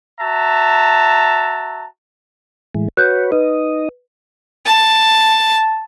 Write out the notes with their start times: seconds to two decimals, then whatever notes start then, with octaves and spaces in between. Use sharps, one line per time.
0.20 F#4 E5 A5 A#5
2.75 A2 E3 G#3
2.97 F#4 B4 C#5 F#6 G6
3.32 D#4 B4 D#5
4.65 A5